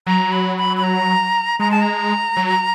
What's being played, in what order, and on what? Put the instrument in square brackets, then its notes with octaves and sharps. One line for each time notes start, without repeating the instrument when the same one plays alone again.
[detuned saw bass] F#3 [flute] A#5
[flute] B5
B5
B5
A#5
[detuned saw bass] G#3 [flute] A#5
[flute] A5
A#5
[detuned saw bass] F#3